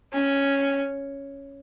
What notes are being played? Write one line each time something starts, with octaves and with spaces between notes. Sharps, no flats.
C#4